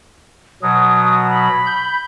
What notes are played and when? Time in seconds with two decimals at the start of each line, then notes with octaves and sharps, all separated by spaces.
0.62 B2 F#3 D#6
1.29 B5
1.66 G6